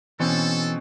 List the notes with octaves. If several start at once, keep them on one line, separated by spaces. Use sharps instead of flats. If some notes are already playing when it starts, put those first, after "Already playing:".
B2 E3 C4 C#4 A4